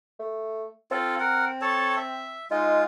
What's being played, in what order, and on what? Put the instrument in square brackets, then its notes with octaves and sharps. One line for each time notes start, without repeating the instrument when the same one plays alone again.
[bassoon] A3
[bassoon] C4 [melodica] F4 A4
[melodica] A#4 F#5
A4 C#5 A5
E5
[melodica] G#3 F4 [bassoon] D#4